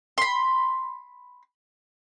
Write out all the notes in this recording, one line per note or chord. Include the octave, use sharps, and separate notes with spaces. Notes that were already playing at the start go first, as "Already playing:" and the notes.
B5 C6